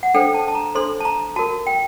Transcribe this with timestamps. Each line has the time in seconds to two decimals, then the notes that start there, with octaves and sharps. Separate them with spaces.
0.03 F#5
0.14 D4 A4 C5 G5
0.34 A5
0.48 A5
0.55 A#5
0.75 D4 A4 C5 C6
1.00 A5
1.05 A#5
1.36 F#4 A#4 A5
1.67 G5